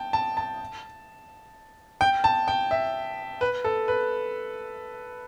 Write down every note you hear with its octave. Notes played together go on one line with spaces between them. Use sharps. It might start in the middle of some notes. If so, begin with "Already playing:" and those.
Already playing: G5 A5
A5
A5
G5
A5
G5
E5
B4
A4
B4